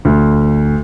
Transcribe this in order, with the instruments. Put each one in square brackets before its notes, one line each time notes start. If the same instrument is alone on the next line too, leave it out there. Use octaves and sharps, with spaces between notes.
[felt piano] D2